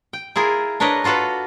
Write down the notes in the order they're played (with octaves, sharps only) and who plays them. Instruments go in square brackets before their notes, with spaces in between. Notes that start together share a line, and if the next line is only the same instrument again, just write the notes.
[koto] G5
E4 F4 G#4 A#4
D4 A#4 B4 C#5 D#5
D4 F4 F#4 A4 B4